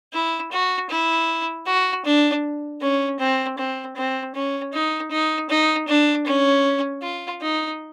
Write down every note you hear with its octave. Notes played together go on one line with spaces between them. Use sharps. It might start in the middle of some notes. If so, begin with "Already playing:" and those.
E4
F#4
E4
F#4
D4
C#4
C4
C4
C4
C#4
D#4
D#4
D#4
D4
C#4
F4
D#4